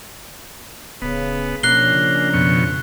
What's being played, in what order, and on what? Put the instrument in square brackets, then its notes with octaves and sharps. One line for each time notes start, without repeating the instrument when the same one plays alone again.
[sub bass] D1 [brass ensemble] C#3 [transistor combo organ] B3
[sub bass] B2 [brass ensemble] F3 C#4 D4 [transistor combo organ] A#3 [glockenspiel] F#6 C7 G7
[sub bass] C#3
[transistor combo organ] F2 B2 C#6